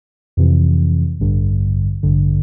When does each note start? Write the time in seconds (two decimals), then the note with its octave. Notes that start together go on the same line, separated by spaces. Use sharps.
0.37 F2 C3 E3
1.20 A1 G2 D3
2.03 A1 G2 D3